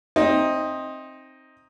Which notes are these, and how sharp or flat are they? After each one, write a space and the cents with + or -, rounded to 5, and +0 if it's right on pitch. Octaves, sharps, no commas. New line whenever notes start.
C4 +15 D#4 +0 E5 +0